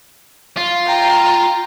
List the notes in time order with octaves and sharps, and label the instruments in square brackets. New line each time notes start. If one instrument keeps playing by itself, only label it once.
[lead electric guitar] F4
[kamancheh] G5 A#5